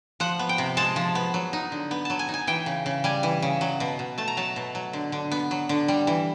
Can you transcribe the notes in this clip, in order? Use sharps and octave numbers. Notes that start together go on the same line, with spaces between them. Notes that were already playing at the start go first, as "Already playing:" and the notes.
F3 F#5
B3
G5
C3
G#3 A5
F3
B3
F#3
D#4
D3
B3
F#3 A5
G#5
D#4
G#5
E3 G5
C#3
C#3
G3 G#5
E3
C#3
F#3
B2
B2
A3 A5
A#5
F#3 A5
B2
F#3
D3
D3
B3
F#3
D3
G3
E3